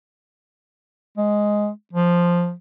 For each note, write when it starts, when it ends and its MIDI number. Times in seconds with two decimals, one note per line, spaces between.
1.17 1.69 56
1.93 2.53 53